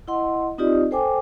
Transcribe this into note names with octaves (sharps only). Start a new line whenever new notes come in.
E4 D#5 F#5 C6
C4 D#4 F4 G4 D5 D#5
A4 C5 G5 G#5 D6